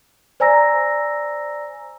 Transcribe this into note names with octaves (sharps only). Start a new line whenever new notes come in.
C5 D5 G#5 A#5 E6 A#6